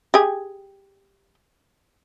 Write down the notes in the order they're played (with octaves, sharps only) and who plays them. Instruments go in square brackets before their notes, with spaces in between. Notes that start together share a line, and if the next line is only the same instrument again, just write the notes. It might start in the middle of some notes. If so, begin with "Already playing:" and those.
[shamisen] G4 G#4